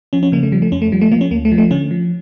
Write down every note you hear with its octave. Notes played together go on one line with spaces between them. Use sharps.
F3 C#4
C#4
C#3 A#3
A3
F3 G3
A3
F2 C#4
A3
F3 G3
A3
F3 A#3
C#4
D2 A#3
A3
F3
A3
D3 C#4
F3